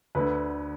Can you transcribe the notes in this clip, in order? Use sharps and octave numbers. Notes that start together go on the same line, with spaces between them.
D2 D3 B4